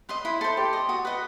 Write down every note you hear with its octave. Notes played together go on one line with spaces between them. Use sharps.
B4 D#5 C6
E4 B5
A4 C5 C6
G4
D#5
F#4 D#6
B4 D#5